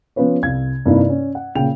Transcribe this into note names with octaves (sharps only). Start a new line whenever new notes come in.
F3 B3 C#4 F4 B4 C#5
C2 F5 G#6
G2 C3 A#3 D#4 E4
C#4
F#5
A#2 C#3 G5 F7